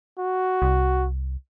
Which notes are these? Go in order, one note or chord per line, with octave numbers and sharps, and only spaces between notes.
F#4
C2